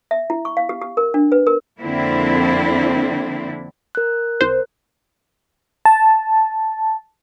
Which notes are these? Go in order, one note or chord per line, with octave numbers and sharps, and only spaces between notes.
E5
E4
C#6
F5
G4
G4
A#4
D4
B4
A#4
F2 D3 A#3 C4 D4 E4
A#4 F#6
C2 C5
A5